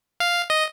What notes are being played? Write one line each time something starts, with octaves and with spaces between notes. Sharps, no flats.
F5
D#5